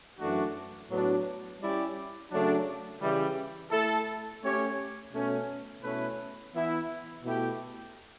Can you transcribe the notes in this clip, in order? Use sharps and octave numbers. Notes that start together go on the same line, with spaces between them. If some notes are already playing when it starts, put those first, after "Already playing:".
F#2 E3 A3 D4 F#4
A2 F#3 B3 D4 F#4
G3 C#4 E4 G4 D5
C#3 F#3 A3 D4
C#3 E3 G3
A3 E4 A4
A3 C#4 G4 C#5
B2 A3 C#4
B2 A3 C#4 E4 B4
E3 B3 E4
B2 A3 E4 G4